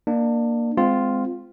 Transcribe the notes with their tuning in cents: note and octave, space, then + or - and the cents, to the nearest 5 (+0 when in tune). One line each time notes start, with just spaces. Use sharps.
A#3 +0 D4 +25
G#3 +0 C4 -25 F4 +0